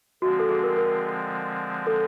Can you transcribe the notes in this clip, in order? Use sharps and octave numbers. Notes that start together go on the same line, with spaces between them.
D3 F3 G#3 C4 F#4
A4
G#4
A#4
A#4
A4